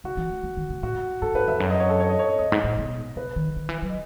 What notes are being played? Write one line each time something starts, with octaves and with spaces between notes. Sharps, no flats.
C#3 F#4
E3
G#3
A3
D#3
C#3
A2 F#4
G#2 A4
G#2 B4
E2 E5
F#2
D#5
C#5
A4
C#5
D#5
C#5
D#5
E2 D#5
G#2
A2
B2
C#3 B4
D#3
D#3
E3
F#3
D#5